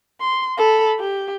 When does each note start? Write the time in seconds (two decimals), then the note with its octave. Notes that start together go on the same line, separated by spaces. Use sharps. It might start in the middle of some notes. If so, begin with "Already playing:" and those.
0.21 C6
0.58 A4 B5
0.99 G4